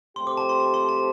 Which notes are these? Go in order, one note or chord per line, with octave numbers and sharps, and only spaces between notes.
F3 A3 C4 G4 C6
D6
A5
C6
A5
C6
A5